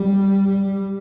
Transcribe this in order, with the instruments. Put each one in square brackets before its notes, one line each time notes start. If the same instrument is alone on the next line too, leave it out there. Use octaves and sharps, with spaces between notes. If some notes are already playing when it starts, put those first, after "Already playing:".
Already playing: [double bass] G3